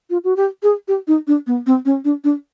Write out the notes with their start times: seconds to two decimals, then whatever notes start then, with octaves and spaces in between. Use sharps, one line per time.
0.10 F4
0.24 F#4
0.37 G4
0.63 G#4
0.88 G4
1.07 D#4
1.27 D4
1.47 B3
1.66 C4
1.85 C#4
2.05 D4
2.24 D4